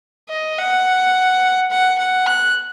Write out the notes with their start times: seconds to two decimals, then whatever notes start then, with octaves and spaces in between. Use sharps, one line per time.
0.29 D#5
0.58 F#5
1.71 F#5
1.99 F#5
2.27 F#6